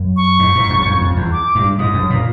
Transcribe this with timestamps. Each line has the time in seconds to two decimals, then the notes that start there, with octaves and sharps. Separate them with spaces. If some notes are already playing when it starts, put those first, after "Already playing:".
Already playing: F#2
0.17 C#6
0.39 G#2
0.55 G#2
0.70 F#2
0.82 E2
0.85 F2
1.01 F2
1.16 E2
1.32 D6
1.55 G2
1.78 G#2 D#6
1.94 F#2
2.10 A#2